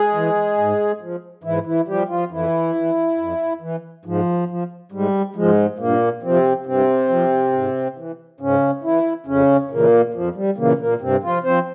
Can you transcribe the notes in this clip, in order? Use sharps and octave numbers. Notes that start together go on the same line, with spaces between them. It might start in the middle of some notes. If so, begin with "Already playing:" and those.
Already playing: G#3 G#4
E3
G#2
F3
G#2 E3 E4
E3 E4
F3 G3 G4
F3 F4
F2 E3 E4
E3
F2
E3
G#2 F3
F3
G#2 G3
G#2 F3 G#3
G2 A#2 A#3
C3 F3 C4
G2 C3 C4
F3
G#2
E3
G#2 C#3 C#4
E3 E4
F2 C#3 C#4
A#2 C#3 E3 A#3
F2 F3
G3
A#2 C#3 E3 A#3
A#2 A#3
G2 C3 C4
F3 F4
F3 C4 C5